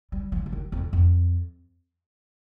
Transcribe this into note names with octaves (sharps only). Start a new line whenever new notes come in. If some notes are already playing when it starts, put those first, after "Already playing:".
G3
F3
F3
D#3
F2
F2